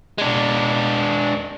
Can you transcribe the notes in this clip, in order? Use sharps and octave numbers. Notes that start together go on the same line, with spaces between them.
G#3 D4